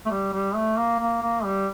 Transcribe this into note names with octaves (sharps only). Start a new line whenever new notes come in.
A3
G3
G3
A3
A#3
A#3
A#3
G3